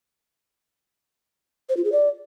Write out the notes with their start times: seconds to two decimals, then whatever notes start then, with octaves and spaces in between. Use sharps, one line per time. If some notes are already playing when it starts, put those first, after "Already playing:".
1.69 C5
1.77 F4
1.84 G#4
1.92 D5